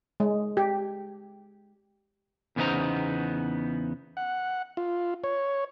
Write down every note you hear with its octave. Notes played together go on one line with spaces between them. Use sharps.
G#3
G4
E2 C#3 B3 D#4 C5 A#5
F#5
F4
C#5